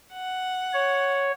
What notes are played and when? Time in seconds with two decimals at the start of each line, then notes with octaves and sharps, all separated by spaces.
0.12 F#5
0.73 C#5